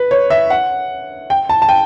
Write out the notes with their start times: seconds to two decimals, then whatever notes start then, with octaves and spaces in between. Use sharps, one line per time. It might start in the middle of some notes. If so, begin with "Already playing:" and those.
Already playing: B4
0.11 C#5
0.30 E5
0.50 F#5
1.30 G5
1.49 A5
1.62 A5
1.69 G5